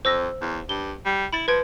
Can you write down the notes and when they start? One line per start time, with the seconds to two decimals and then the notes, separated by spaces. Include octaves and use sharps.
0.05 F2 C5 E6 A#6
0.41 E2
0.69 G2 G7
1.06 G3
1.33 E4 B5 A6
1.48 F3 B4 G#6 D7